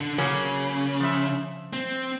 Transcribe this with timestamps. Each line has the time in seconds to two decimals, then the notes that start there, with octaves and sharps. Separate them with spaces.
0.01 D3
0.18 C#3 F#3 A#3 C#4
1.00 F3 E5
1.73 C4